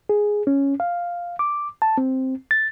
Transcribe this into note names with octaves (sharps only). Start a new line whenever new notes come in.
G#4
C#4
F5
D6
A5
C4
A6